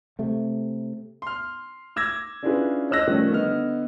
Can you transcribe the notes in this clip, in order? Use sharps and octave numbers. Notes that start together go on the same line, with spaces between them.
C3 A3
C6 F6
D6 E6 G#6 A#6
C#4 D4 E4 F4 G#4 B4
C#5 D#5 E6 F#6 A#6
D#3 F3 G3 A3 C#4
D3 B3 D#5 F6